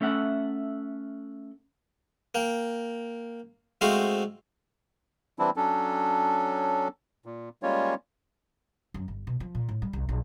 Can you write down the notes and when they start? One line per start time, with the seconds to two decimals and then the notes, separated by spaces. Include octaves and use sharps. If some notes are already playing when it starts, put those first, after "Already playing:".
0.01 A3 C#4 A4 E5 F#5
2.35 A#3 G5
3.81 G#3 A3 C4 F#4 C5 F5
5.39 E3 G3 C4 D4 E4
5.56 F#3 C#4 D4 A4
7.26 A#2
7.63 G3 G#3 A#3 C#4 F4 C#5
8.94 F#2
9.08 G1
9.27 B2
9.40 F3
9.55 A#2
9.69 A2
9.82 G3
9.93 C2
10.09 A#1